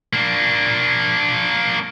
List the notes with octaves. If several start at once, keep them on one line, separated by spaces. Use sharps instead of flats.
A#3 D4